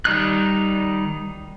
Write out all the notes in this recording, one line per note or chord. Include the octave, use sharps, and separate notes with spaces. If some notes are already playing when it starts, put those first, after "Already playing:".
D#3 G3 D#4 F#6